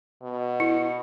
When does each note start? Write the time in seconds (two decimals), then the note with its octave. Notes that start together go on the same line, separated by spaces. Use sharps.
0.23 B2
0.60 E4